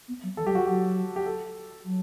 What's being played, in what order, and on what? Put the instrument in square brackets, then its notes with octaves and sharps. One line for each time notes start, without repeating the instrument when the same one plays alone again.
[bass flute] B3
F#3
[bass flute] E3 [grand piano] A4
[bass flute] G3 [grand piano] G4
[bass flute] F#3
[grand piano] F#4
[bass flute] F#3 [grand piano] G4
[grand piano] G4
A4
[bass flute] F#3